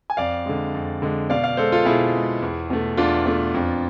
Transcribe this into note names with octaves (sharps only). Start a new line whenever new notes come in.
G#5
F2 D5 F5
D3 G#3
F2
D3 G#3
B2 D5 F5
D5 F5
G#3 A4 C5
F4 A4
B2 E4 G#4
G#3
E2
B2 A3
E2 D4 F4
B2 A3
F2